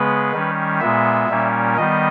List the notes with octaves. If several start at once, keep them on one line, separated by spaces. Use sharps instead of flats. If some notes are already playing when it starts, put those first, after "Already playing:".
Already playing: C#3 G#3 B3 B4
D#3 G3 C#4
A#2 G#3 B3 E5
A#2 G3 A#3 C#4
D#3 G3 B3 D#5